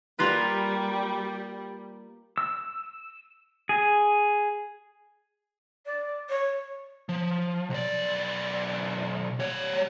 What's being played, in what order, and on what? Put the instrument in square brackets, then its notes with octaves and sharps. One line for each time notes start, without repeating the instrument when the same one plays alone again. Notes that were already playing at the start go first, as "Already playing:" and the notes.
[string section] G3 [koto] A#3 F4 B4
[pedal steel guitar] E6
G#4
[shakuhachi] D5
C#5
[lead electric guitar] F3
B1 D5
G3 C#5